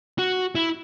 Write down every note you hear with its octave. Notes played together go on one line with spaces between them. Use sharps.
F#4
E4